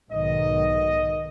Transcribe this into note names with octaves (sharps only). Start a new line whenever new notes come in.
B1 G#2 D#3 D#5